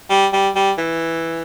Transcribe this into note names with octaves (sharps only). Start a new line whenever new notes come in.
G3
G3
G3
E3